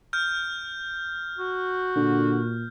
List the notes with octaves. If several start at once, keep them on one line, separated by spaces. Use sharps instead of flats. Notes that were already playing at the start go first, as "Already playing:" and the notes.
F6 G6
F#4
A#2 D3